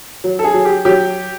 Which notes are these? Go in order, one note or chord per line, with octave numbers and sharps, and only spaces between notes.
F#3
A4
G#4
F#3
G4
F#3 G4